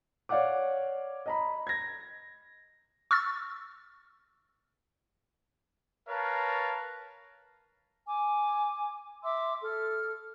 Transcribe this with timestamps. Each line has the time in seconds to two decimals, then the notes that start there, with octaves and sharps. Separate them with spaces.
0.29 C#5 D5 F5 F#5 D6
1.26 D#5 A#5 B5
1.67 G#6 A#6
3.11 C#6 E6 F6 A6
6.08 A#4 B4 C#5 F5 A5 A#5
8.08 G#5 D6
9.23 E5 C6 D6 E6
9.63 A4 F6